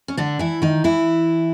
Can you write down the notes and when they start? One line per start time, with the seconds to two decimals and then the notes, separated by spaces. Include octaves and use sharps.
0.08 C#4
0.17 D3 D4
0.39 E3 E4
0.62 D#3 D#4
0.84 E3 E4